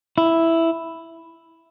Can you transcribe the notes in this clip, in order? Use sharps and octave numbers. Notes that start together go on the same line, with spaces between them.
E4